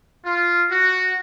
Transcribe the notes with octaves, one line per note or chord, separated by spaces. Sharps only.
F4
F#4